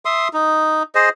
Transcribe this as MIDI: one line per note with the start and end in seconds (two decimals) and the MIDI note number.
0.05 0.28 76
0.05 0.28 84
0.05 0.28 87
0.33 0.83 63
0.95 1.09 68
0.95 1.09 72
0.95 1.09 75